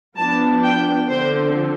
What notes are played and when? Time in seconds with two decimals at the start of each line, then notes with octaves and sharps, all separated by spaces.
0.16 F3 B3 D4 A5
0.63 G5
1.08 D3 F3 C4 C5